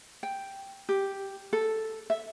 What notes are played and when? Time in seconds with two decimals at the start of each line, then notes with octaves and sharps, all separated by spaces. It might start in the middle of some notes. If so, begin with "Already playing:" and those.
0.23 G5
0.89 G4
1.53 A4
2.10 E5